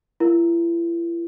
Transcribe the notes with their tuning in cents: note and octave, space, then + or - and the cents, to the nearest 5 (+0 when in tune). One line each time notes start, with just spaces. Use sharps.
E4 +40 A#4 +15